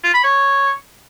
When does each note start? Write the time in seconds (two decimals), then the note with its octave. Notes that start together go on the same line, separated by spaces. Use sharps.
0.03 F4
0.14 B5
0.24 C#5